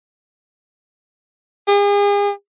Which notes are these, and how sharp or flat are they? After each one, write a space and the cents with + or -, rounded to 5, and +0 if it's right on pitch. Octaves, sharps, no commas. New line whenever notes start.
G#4 -40